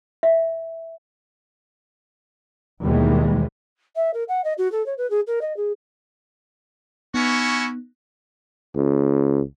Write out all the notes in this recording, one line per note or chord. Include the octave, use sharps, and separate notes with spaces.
E5
D#2 B2 D#3 E3 G3 G#3
E5
A#4
F#5
D#5
F#4
A4
C#5
B4
G#4
A#4
D#5
G#4
B3 C#4 D#4 E4 F#4
C#2